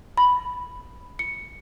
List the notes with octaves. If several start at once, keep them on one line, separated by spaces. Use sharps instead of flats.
B5
C#7